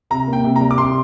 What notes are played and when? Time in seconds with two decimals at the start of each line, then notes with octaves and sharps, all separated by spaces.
0.10 C3 A#5
0.27 A#3
0.33 G5
0.44 C3
0.56 A#5
0.61 G3
0.71 D6
0.78 C3 C6